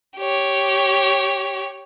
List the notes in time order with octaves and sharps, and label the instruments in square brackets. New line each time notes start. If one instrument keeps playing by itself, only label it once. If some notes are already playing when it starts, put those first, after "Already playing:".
[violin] G4 C#5